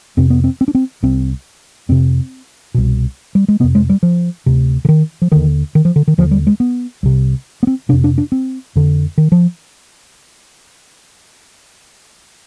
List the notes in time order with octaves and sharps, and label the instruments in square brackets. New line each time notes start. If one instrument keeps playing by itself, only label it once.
[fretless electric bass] F2 C3 C4
B3
C4
C4
D4
C4
C2 C3 C4
F2 C3 C4
C2 B2
G3
G#3
C3 B3
F2
G#3
G3
F3
D2 C3
D3
D#3
F3
D#2 D3 D#3
D#3
F3
D3
D#3
D#2 D3 F3
G3
G#3
B3
C2 C3
B3
C4
C3 D4
F2
D4
D4
C4
F2 D3
D#3
F3